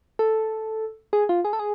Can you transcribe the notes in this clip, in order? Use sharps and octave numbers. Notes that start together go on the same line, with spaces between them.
A4
G#4
F4
G#4
A4
G#4